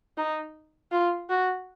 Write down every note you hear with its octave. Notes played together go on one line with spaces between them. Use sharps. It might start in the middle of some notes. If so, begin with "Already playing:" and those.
D#4
F4
F#4